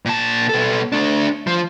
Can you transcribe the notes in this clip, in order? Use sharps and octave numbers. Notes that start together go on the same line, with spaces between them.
A#2 A5
B2 A4
A3 D4
F3